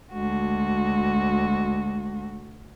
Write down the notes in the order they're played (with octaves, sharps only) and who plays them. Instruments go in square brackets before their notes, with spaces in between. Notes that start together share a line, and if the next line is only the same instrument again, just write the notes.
[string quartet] D2 F#4 [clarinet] G#3